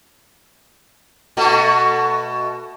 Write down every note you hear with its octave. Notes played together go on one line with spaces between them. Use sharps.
B2 A3 F#4